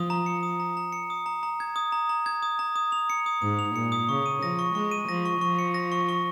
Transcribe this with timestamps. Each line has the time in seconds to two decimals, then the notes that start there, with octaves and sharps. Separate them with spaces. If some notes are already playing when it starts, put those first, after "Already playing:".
Already playing: F3 D#6
0.10 A#5
0.26 C#7
0.43 D#6
0.60 A#5
0.77 A#5
0.93 C#7
1.10 D#6
1.26 A#5
1.43 A#5
1.60 G#6
1.76 D#6
1.92 A#5
2.09 A#5
2.26 G#6
2.43 D#6
2.59 A#5
2.76 D#6
2.92 F7
3.10 C#7
3.26 D#6
3.42 G#2 D#6
3.59 F7
3.75 A#2 C#7
3.92 D#6
4.09 C#3 C#6
4.26 D#7
4.43 F3 A#6
4.59 C#6
4.75 G#3 C#6
4.91 D#7
5.08 F3 A#6
5.25 C#6
5.41 F3 C#6
5.59 C#7
5.74 A#6
5.92 C#6
6.09 C#6